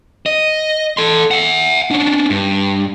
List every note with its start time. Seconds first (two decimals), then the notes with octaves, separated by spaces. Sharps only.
0.26 D#5
0.97 A4 C6
1.31 E5 F#5
1.91 C#4 D4
2.30 G2